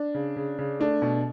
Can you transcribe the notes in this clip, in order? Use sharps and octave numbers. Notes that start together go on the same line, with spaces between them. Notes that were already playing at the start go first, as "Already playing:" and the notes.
Already playing: D4
C#3
C#3
C#3
A3 D4
B2